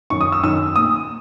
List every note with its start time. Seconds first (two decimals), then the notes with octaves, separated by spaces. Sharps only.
0.10 F#2 D#3 C#6
0.21 D#6
0.32 E6
0.43 F#2 D#3 E6
0.76 A#2 D#6